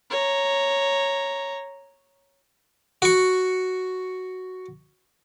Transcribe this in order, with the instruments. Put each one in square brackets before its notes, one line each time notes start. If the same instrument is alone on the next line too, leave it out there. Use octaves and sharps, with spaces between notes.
[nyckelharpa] C#5 A#5
[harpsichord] F#4 C#6